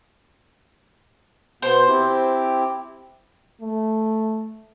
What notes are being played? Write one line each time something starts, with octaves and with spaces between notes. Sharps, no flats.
B2 B3 C5
C4 E4 G4
A3